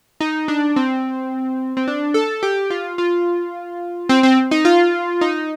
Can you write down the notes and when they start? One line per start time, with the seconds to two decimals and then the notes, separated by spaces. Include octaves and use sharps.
0.21 D#4
0.48 D4
0.76 C4
1.77 C4
1.88 D4
2.14 A4
2.43 G4
2.70 F4
2.98 F4
4.09 C4
4.23 C4
4.51 D#4
4.65 F4
5.21 D#4